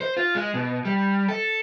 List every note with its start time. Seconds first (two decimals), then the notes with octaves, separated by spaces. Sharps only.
0.01 C5
0.17 F4
0.35 G#3
0.54 B2
0.85 G3
1.28 A4